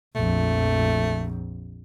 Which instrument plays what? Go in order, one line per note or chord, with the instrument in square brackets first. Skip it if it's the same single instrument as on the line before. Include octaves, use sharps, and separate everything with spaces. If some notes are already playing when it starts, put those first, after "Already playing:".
[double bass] A#1 F2 [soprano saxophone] A3